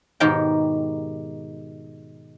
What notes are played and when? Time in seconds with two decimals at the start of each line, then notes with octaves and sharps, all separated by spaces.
0.20 G#2 B2 D#3 G4 A#4 G5